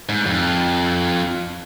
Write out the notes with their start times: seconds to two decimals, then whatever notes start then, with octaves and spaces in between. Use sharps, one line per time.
0.09 G#2
0.26 F2